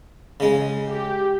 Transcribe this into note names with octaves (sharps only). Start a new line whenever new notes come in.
C#3 G#3
G4